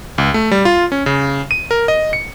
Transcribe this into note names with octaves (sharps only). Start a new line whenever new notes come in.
C#2
A3
G3
F4
C#4
C#3
D#7
A#4
D#5
C#7